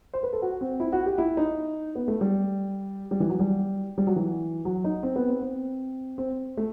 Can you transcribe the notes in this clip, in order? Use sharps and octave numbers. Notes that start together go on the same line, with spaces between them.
C5
B4
A4
F#4
C4
E4
F#4
G4
E4
D#4
B3
A3
G3
G3
E3
F#3
G3
G3
F#3
E3
F#3
D#4
C4
B3
C4
C4
C4
A3